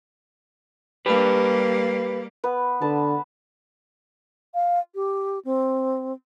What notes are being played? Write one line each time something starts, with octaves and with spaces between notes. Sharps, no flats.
G3 A#3 G4 B4
B3 B4
D3 B4 A5
F5
G4
C4